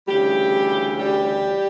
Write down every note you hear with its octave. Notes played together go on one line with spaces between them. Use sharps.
D2 C#3 E3 G3 G4
G3 G4